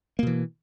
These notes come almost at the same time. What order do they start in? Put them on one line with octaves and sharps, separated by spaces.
A#3 B2 E3